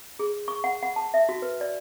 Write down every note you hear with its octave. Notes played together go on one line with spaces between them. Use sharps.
G#4
C#6
F#5
F#5
A5
E5
F#4
B4
D5